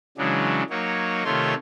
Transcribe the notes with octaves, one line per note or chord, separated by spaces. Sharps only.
C#3 E3 F#3 G#3 D4
F#3 A#3 D#4 C#5
C3 D#3 A3 F4 C#5 C6